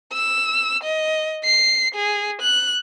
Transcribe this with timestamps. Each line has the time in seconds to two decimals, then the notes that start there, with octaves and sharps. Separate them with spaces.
0.13 E6
0.84 D#5
1.45 C7
1.95 G#4
2.42 F#6